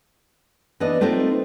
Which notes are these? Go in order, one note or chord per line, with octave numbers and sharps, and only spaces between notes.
E3 B3 D4 D#5
A3 C4 D#4 F4 A#4